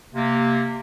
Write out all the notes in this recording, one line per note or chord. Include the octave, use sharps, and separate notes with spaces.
C3 A#3